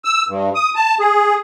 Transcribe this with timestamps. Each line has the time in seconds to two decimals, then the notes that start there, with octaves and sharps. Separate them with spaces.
0.05 E6
0.28 G2
0.55 D#6
0.76 A5
1.00 G#4